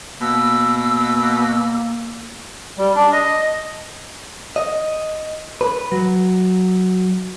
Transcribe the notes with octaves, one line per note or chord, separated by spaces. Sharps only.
B2 A#3 E6
G3
D4
D#5
D#5
B4
F#3